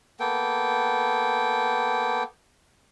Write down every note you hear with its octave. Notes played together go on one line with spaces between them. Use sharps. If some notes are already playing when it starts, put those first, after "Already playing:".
A#3 B3 A4 G5